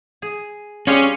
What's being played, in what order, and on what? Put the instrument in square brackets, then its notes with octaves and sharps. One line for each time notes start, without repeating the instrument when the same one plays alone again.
[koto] G#4
[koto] G3 F4 G#4 [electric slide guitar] C#4